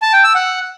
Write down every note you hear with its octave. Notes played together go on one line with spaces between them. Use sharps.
A5
G5
E6
F#5